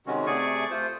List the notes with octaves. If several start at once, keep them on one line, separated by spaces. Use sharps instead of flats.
C3 D#3 G#3 C#4 F#4
C3 A3 G#4 D5 G#5 C#6
A3 F4 C5